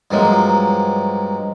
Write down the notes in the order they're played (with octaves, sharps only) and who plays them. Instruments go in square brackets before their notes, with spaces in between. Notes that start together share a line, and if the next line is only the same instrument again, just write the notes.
[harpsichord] G2 F3 F#3 G#3 A#3